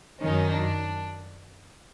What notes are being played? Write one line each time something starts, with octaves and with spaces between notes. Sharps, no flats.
F#2 D#3 F#3 C#4 D#4
D4